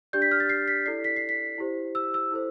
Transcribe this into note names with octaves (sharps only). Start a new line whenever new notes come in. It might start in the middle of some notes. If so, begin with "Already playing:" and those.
D4 G4 D5 G6
B6
F6
A6
C7
B6
E4 A4 D5 C7
B6
C7
B6
E4 G4 C5
E6
E6
E4 A4 C5